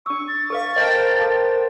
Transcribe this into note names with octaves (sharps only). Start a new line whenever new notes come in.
D4 C#6 E6
A6
A4 B4 F5 C#6
A#4 C5 D#5 F5 G5 A5
A4 F5 A5